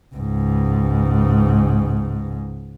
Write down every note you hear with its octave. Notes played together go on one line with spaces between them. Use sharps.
C#2 G#2